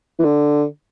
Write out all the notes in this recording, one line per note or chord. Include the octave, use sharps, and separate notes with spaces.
E3
D3